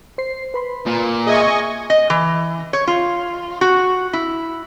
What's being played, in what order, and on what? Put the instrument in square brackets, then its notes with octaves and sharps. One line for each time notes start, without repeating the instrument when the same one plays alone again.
[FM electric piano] C5 C7
B4 B5 C6
[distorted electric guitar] A#2
[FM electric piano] G#4 E5 [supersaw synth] D#5 G#5 C#6
[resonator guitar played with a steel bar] D#5
E3
C#5
F4
F#4
E4